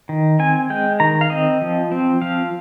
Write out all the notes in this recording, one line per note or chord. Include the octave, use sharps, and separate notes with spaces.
D#3
C4 G#5
G#3 G5
D#3 A#5
F5
C4 D#5
F3
C4
F3 F5